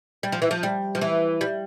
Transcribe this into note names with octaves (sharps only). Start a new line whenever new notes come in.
G3
F3
E3
F3
G3
F3
E3
G3